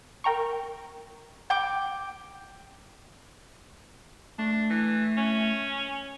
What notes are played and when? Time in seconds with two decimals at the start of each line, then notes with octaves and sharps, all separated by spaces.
0.24 A#4 G5 A#5 C#6
1.50 G5 D6
4.38 A3 D4
4.70 E3
5.17 C#4